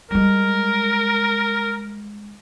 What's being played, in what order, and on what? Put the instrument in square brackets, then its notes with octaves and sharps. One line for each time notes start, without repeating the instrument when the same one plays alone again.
[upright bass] G3 G#3 [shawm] A#4